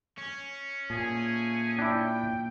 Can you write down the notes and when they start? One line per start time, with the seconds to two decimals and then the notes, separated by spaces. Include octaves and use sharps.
0.18 C#4
0.90 A#2 A3 G#4 G#5
1.78 D4 E4 G5